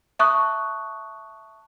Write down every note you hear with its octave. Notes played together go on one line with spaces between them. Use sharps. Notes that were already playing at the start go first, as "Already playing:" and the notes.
E5 A5 C#6 D#6 F#6